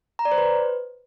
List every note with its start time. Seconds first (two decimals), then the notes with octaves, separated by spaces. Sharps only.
0.19 A#5
0.25 D5
0.32 C5
0.38 B4